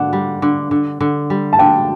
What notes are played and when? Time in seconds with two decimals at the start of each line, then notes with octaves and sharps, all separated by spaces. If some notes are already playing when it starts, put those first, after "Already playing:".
Already playing: D3 D4 F#5
0.13 G3
0.42 D3
0.71 D3
1.01 D3
1.30 G3
1.53 A5
1.59 D3 G5